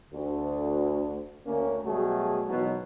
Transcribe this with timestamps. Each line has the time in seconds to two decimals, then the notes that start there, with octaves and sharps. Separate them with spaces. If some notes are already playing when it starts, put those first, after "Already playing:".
0.14 D2
1.46 D2 A#3 C#4
1.85 B2 F#3 G3 A3 F#4 G#4
2.48 G#1 B2 E3 F#3